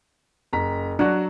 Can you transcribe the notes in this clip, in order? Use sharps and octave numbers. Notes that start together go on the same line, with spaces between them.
F#1 A#5 B6
F#3 D4 F#4